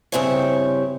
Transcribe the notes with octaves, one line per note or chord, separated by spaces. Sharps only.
G2 C#3 C4 E4 G4 C#5